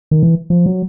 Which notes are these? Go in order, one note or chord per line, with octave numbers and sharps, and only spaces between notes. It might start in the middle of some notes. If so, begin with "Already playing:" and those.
D#3
E3
F3
F#3